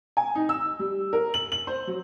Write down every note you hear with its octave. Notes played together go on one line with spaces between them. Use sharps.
G#5
D#4
E6
G3
A#4
F#7
F#7
C5
F#3